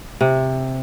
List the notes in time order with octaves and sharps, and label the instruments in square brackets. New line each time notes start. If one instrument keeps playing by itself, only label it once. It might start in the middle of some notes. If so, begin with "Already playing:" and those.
[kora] C3